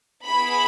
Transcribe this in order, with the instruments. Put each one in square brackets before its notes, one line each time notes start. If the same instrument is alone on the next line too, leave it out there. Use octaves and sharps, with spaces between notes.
[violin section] B3 E4 G#4 B5